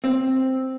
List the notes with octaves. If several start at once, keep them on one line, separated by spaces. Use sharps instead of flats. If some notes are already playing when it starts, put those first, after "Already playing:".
C4